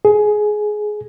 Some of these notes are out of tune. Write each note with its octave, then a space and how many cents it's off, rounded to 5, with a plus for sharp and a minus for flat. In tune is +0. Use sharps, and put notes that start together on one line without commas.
G#4 +15